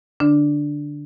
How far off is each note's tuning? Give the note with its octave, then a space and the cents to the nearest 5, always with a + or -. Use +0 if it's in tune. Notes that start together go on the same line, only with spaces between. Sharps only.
D3 +0 D4 +0